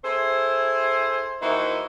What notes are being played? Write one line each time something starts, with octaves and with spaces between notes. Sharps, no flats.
E4 G#4 A4 C5
E3 A#3 D#4 F#4 C5 E5